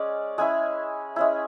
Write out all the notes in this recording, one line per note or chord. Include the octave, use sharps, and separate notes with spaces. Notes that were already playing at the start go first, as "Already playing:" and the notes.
Already playing: G#3 C#4 D5
G#3 C#4 E4 G#5
G#3 C#4 E4